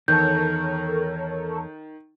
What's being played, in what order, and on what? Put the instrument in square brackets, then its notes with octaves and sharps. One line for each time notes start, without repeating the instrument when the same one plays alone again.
[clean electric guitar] E2 A5 [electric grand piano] D#3 [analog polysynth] A4 A#4 C#5 [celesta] G6